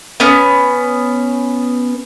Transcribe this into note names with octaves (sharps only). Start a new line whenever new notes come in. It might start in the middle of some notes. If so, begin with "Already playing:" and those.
B3 C#4